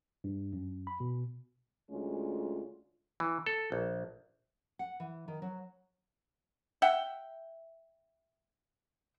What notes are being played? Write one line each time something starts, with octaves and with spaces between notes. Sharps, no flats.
G2
F#2
B5
B2
D2 G#3 C#4 F4
E3
A4
A#1
F#5
E3
D#3
F#3
E5 F#5 G5